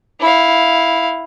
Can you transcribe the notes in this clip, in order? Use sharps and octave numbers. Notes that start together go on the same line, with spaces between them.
E4 F5